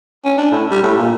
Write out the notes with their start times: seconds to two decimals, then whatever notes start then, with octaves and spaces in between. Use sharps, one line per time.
0.25 C#4
0.38 D4
0.52 A2
0.71 G3
0.83 A2
0.97 A#2